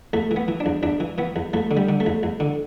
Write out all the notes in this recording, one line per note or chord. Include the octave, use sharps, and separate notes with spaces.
E2 A3
E3
B3
E3
D4
E2
E2 D4
E3
E3 B3
E2
E2 A3
D3
G3
D3
A3
E2
E2
D3